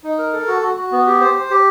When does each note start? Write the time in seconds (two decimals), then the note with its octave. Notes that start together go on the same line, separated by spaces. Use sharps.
0.04 D#4
0.18 A#4
0.33 A4
0.48 F#4
0.62 F#4
0.77 F#4
0.92 B3
1.06 G4
1.21 C5
1.35 C5
1.51 G4